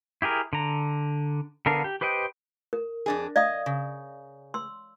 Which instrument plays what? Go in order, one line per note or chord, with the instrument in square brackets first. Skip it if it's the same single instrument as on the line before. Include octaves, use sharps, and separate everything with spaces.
[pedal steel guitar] E4 G4 G#4 A#4
D3 A#5
D3 B3 D4 A#4 F5
G4
G4 B4 C5 D#5 G5
[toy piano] A#4
[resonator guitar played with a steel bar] F2 D4 G#4
[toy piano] D5 F5 D#6 [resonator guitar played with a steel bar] D#5
[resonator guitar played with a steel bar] C#3
[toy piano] C6 E6